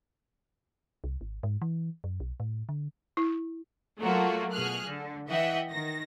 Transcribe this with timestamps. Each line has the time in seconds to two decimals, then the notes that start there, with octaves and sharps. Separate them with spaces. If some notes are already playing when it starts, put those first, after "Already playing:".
1.04 C2
1.21 G#1
1.43 G#2
1.62 E3
2.04 F#2
2.20 B1
2.40 A2
2.69 D3
3.17 E4
3.99 F#3 A3 A#3 F4 F#4
4.53 B2 G#4 F6 F#6
4.86 D3
5.29 E3 D#5 E5 F#5 G5
5.70 D#3 A#6